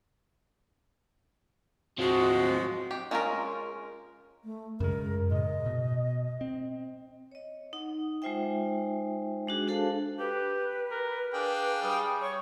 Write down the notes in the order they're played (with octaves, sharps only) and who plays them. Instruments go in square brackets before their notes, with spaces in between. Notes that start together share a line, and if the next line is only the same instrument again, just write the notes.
[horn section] F3 G#3 [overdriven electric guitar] F#3 C4 [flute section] F#4
[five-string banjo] G4
G#3 C#4 F4 A4 A#4
[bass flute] A3
[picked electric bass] F#2 C#3 G#3 [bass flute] A#4
[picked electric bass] A2 C#3 [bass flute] D#5
[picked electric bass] B2
C4
[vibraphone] C#5 D#5
D#4 F#5
G#3 D#4 F4 C5 E5 G5
G#3 D4 F#4 G#4
D4 F#4 A4 C5 F5 A5
[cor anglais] G4 [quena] B4
[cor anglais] A#4
[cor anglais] D4 [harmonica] G#4 F5 G5
[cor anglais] G3 [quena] D#6
[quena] C#5 [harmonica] C#6